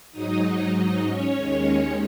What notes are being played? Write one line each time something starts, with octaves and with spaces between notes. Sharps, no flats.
G#2 F#3 D#4 D#5
D#4 D#5
C#4 C#5
D#2 D#3 G#3